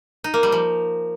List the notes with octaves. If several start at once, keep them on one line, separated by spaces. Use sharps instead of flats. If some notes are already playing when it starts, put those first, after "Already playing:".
D#4
A#3
G3
F3